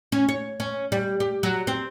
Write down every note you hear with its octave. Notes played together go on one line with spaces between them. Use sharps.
C#4
C#5
C#4
G3
G4
F#3
C4